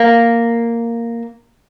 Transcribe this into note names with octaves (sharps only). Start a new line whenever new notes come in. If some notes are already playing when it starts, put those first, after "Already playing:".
Already playing: A#3